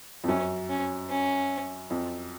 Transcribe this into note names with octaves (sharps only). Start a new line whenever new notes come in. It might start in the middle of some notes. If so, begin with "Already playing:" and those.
F2
F#2 C#4
C#4
C#4
F2